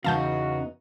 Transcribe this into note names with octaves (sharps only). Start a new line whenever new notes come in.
E2 C#3 B3 D#4 F#4 F5 A5 G6